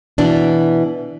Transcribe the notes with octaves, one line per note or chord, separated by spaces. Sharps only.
B2 E3 D4